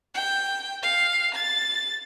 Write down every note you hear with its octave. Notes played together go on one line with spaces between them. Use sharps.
G5
F5
A6